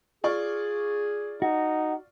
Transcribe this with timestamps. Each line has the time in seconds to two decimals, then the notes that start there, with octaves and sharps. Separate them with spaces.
0.24 F4 G#4 D5 C#6
1.42 D#4 F#4